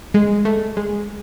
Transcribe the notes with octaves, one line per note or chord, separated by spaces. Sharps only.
G#3
A3
G#3